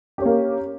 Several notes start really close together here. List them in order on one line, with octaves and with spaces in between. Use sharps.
G4 C#4 A#3